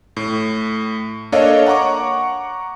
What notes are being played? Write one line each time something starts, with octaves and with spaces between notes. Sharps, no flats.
A2
A#3 D4 A4 C#5 D#5 F5
F#5 A#5 C#6 D6